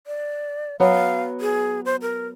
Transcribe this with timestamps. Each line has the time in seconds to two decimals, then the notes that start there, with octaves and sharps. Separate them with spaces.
0.07 D5
0.80 F#3 B3 F5
1.41 G#4
1.85 C5
2.02 A#4